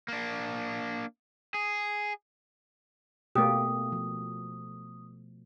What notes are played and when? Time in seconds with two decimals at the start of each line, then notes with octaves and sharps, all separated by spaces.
0.08 A#3 D4
1.54 G#4
3.36 B2 A3 A#3 G4 D#6
3.92 F3